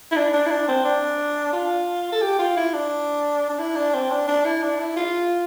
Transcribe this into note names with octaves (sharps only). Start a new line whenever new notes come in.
E4
D4
D4
E4
D4
C4
D4
F4
A4
G4
F4
E4
D4
D4
E4
D4
C4
D4
D4
E4
D4
E4
F4